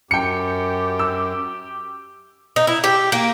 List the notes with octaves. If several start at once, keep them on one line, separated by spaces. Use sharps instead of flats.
F#2 G4 G5 C#7
E6
D#4
E4
G4
A#3